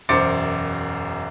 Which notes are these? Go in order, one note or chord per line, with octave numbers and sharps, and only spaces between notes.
E1 F#2 C5 D6 A6 C#7